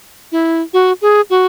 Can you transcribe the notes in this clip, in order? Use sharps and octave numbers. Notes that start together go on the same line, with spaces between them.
E4
F#4
G#4
F#4